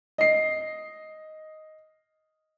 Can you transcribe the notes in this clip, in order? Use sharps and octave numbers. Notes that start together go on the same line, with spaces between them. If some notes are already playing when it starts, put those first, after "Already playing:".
D#5 C7